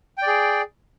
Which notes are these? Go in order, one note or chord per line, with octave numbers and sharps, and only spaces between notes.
G#4 D5 G5